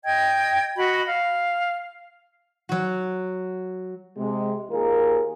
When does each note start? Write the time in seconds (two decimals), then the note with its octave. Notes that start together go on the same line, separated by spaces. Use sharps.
0.04 D#5 G5 G#6
0.77 F#4 D#5 B5
1.07 F5
2.69 F#3 F#4
4.18 C3 G#3
4.70 D#2 F4 G#4 A#4